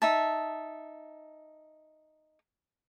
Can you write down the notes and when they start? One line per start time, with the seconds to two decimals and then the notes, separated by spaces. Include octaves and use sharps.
0.02 D#4 E5 A5